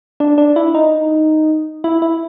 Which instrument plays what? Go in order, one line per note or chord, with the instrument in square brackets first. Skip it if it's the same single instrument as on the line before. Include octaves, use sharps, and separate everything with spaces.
[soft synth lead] D4
D4
E4
D#4
E4
E4